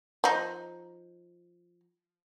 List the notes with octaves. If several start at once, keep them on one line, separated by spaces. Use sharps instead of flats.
F3 D#4